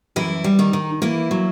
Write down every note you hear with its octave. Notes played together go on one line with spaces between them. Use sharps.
F#2 E3 E4
G3
D#3 D#4
D#3
E3 A#3 E4
F#3